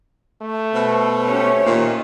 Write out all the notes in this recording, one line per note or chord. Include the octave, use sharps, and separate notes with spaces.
A3
B2 C5
C#4 G4 C#5
A#2 D#3